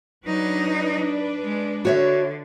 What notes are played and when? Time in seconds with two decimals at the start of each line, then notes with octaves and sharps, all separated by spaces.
0.25 F#3 D4 D#4 B4 D5
1.43 G#3
1.85 D3 F#4 C#5 E5